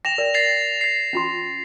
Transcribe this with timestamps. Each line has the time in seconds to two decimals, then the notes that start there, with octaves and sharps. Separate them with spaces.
0.05 G5 A#6 E7 F7
0.18 A#4 D5
0.34 A6 C7 F7
0.81 A6 C7
1.13 C#4 F4 C6